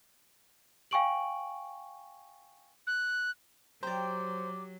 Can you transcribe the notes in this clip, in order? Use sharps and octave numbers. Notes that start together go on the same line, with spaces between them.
F5 G5 G#5 C#6 D7 F#7
F#6
F#3 G4 C5 D5 A#5